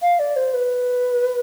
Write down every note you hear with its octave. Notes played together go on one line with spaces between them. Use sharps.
F5
D5
C5
B4